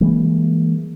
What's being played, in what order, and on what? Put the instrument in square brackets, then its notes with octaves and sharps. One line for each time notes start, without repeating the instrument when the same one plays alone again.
[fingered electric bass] E3 G3 G#3 A#3